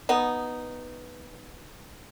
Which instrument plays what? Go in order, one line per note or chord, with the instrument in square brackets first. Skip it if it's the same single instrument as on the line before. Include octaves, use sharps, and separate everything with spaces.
[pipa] B3 D#4